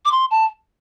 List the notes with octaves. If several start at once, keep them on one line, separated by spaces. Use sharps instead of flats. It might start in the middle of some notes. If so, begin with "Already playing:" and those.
D6
C6
A5